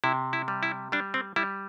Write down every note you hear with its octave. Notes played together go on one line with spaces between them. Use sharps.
C3 E4
E4
G3
E4
G3 D4
C4
G3 E4